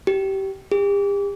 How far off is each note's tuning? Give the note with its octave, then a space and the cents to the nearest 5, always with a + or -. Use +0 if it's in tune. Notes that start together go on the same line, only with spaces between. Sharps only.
G4 -20
G4 +40